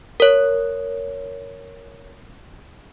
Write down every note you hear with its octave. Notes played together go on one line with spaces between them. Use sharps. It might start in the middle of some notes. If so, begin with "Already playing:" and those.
A#4 C#5